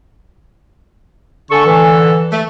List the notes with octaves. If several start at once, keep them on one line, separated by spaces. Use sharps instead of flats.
D3 A4 G#5 A5 C#6
E3
A3